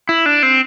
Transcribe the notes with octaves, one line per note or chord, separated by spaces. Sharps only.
E4
D4
C4